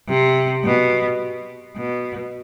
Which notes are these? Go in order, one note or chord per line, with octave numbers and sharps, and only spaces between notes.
C3
B2
B2